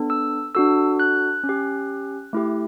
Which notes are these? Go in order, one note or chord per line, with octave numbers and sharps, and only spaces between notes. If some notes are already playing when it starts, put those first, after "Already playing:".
Already playing: B3 D4 A4
E6
D4 F#4 A4 E6
F#6
C#4
G4
A3 E4 G4